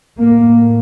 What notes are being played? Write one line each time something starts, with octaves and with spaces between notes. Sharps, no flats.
A2 A#3